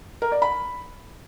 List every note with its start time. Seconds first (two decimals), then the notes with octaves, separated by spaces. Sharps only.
0.22 A#4
0.32 D5
0.42 B5